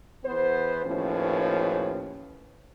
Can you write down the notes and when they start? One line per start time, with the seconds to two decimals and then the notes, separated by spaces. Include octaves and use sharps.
0.24 E2 B3 C5
0.85 D#2 A2 F3 C#4 B4